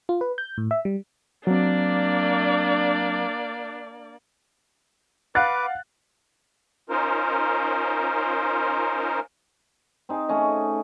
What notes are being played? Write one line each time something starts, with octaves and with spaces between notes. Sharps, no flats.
F4
B4
G6
A2
E5
G3
F#3 A#3 C4 D4 D5
B4 F5 F#5 D6 F#6 A6
C#4 D#4 F4 A#4 C5
C4 D#4 G#4
A3 C#4 D#5